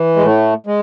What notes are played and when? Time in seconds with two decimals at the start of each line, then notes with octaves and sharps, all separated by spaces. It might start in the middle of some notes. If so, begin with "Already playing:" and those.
Already playing: E3
0.16 G#3
0.23 A2 A3
0.67 G#3